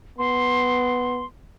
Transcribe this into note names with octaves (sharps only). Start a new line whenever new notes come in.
B3 C6